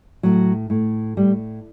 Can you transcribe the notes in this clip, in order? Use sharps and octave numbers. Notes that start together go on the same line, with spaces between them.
A2 F#3
A2
A2 G3